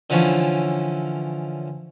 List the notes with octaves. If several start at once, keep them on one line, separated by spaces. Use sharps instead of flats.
D3 E3 F3 C#4